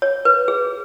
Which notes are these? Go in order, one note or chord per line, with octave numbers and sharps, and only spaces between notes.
C#5
B4
G#4